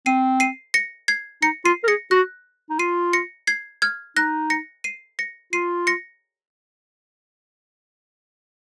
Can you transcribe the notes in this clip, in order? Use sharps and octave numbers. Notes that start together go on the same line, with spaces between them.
C4 C7 D#7
C7 D#7
A#6 C#7
G#6 C7
D#4 A#6 C#7
F4 C7 D#7
A#4
G#4 A#6 C#7
F#4 F#6 A#6
D#4
F4 C7 D#7
A#6 C#7
G#6 C7
F6 G#6
D#4 F#6 A#6
A#6 C#7
C7 D#7
A#6 C#7
F4 C7 D#7
A#6 C#7